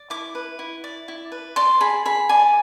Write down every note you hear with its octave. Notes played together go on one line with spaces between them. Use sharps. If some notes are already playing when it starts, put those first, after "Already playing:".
Already playing: D5
E4 D6
B4
E4
D5
E4
B4
D5 C6
G#4 B5
G#4 B5
D5 G#5